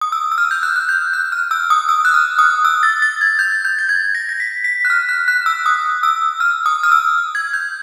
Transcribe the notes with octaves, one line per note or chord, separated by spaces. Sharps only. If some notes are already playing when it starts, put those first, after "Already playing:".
D#6
E6
E6
F6
G6
F#6
F#6
G6
F#6
F6
E6
D#6
E6
F#6
F6
D#6
E6
A6
A6
G#6
G6
G6
A6
G#6
A#6
A#6
B6
B6
F#6
F6
F#6
F#6
E6
D#6
E6
F6
D#6
F6
E6
G#6
G6